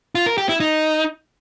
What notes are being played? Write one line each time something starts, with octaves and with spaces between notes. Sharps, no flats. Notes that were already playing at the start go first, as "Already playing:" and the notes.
F4
A#4
G4
E4
D#4